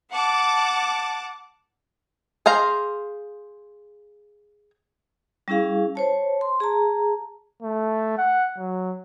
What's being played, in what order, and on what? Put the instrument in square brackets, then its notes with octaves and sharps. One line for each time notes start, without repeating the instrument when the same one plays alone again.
[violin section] F#5 A5 D6
[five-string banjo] G#4 C5 F5 A#5
[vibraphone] G3 C#4 E4 G#4 F5
C5 C#5 A5
C6
G#4 A5 A#5
[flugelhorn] A3
F#5
F#3